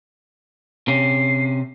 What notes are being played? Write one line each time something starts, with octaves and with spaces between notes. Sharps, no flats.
C3 C#4 C7